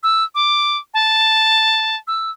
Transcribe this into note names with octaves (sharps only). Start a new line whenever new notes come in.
E6
D6
A5
E6